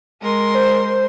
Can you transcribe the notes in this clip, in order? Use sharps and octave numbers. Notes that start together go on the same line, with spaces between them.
G#3 A#4 C6
C5